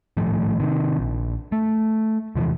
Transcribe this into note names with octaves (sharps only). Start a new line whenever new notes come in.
G#1 A2 F3 A3
C3 D#3
A#1
A3
E2 C3 E3 F3